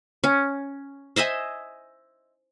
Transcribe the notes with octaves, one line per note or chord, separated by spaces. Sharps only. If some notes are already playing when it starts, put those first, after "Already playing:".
C#4
C5 D#5 E5 G#5